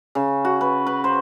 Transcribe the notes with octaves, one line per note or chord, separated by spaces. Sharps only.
C#3
F#4
B4
B4
C5